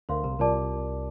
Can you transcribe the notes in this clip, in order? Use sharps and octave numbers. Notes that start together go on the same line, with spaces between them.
D2 D3 A#4 F5 C6
C2 C3
C2 C3 F4 A#4 D5 A5 D6